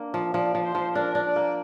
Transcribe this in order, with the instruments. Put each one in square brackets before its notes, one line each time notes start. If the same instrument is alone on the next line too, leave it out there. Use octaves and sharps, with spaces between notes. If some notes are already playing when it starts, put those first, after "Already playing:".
Already playing: [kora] A#3 D4
F3
[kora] F3 [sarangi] D5
[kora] F3
[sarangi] C5
[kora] F3
[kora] D4 [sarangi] A#4
[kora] D4
[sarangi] D5
[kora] A#3